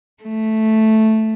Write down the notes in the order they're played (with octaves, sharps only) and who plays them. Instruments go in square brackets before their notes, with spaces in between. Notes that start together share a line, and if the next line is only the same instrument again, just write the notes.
[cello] A3